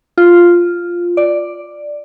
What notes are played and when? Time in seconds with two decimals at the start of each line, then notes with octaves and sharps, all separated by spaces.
0.18 F4
1.17 D5